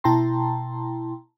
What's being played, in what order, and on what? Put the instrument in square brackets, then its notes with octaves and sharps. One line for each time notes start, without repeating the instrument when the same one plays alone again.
[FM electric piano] B2 E4 G5 A5 A#5 C6